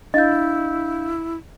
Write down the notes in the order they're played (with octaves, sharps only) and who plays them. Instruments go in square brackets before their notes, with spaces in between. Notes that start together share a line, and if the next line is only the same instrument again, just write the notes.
[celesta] D4 F5 G6 [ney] E4 [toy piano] D#5